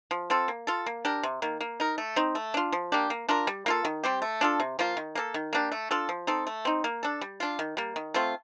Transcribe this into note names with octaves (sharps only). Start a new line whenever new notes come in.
F3
C4 F4 A4
A#3
F4 A4
A#3
D4 G4 A#4
C3
D#3 A#3
A#3
D#4 A#4
A3
C4 D#4
A3
D4 F4
F3
A#3 D4 G4
A#3
D4 F4 A#4
G3
A#3 F4 A4
D#3
G3 C4 G4
A3
D4 F4 A4
C3
F3 A#3 F4
D#3
A#3 D4 A4
D#3
A#3 D4 G4
A3
D4 F4 A4
F3
C4 D#4 A4
A3
C4 D#4
A#3
D4 A4
G3
D4 F4
D#3
G3 A#3
D#3
A3 C4 F4